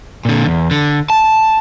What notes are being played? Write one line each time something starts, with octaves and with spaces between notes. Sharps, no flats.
A#2 D3
E2
D3
A5